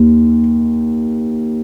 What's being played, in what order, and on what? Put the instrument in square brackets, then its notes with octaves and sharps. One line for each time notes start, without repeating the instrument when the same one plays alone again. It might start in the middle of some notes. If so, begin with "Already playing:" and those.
Already playing: [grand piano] D#2